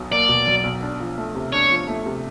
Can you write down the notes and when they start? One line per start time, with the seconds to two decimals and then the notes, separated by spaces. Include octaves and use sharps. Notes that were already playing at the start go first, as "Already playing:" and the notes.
Already playing: B1 B2 F#3
0.11 A#3 D5
0.29 B2
0.47 F#3
0.64 B1
0.82 D4
1.00 F3
1.17 A3
1.35 C3
1.53 D4 C#5
1.71 F3
1.88 A3
2.06 C3